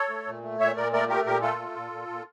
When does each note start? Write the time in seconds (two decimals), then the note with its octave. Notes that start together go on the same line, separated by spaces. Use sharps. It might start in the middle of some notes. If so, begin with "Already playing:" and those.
Already playing: A4 C#5
0.10 A3
0.27 A#2
0.43 A3
0.59 A#2 C#5 E5
0.76 A#2 A#4 D5
0.92 A3 A#4 D5
1.09 A3 G4 A#4
1.25 A#2 G4 A#4
1.42 A3 F4 A4
1.59 A3
1.75 A#2
1.92 A#2
2.08 A#2